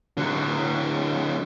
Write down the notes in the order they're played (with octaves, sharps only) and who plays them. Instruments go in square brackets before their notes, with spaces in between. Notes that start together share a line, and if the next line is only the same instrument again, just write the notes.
[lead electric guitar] D3 F#3